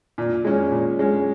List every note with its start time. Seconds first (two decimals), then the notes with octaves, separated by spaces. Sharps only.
0.18 A#2
0.44 G#3 C#4
0.71 A#2
0.99 G#3 C#4